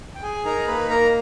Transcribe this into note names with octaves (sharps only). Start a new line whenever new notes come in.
G5
G#4 G#5
D#4 A#4 A#5
A#3 B4 B5
A#3 A#4 A#5